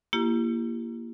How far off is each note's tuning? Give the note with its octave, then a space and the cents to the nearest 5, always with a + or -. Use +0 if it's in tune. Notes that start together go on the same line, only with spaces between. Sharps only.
A#3 +0 E4 +35 G4 +0